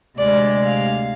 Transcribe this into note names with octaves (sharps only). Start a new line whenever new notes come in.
D2 C3 G#3 D5
F5